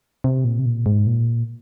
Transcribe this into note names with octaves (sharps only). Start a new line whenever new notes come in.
C3
A#2
C3
A#2
G#2
A#2